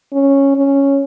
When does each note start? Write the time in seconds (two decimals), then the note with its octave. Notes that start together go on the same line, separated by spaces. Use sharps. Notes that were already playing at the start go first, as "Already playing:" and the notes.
0.12 C#4
0.56 C#4